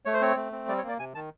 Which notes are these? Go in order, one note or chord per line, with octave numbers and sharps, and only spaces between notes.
A3 C#5
C5
C4 C#5
A3
C4
G3 D5
C#5
A#3
D5
C3 G#5
D#3 A5